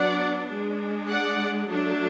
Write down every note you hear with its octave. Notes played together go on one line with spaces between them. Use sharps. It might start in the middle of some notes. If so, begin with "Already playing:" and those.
Already playing: F#3 B3 D4 D5 F#5
G#3 D4
D5 F#5
F#3 A3 D4